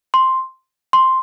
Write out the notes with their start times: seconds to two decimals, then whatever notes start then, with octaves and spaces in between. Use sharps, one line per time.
0.14 C6
0.93 C6